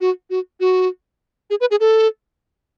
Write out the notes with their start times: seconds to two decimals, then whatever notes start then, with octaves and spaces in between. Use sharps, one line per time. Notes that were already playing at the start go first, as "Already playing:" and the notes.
0.01 F#4
0.30 F#4
0.60 F#4
1.50 G#4
1.61 B4
1.71 G#4
1.80 A4